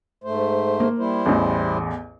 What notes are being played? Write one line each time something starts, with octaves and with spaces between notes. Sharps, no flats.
G#2 A3 C5
A#3
G3 E4 C5
A1 E2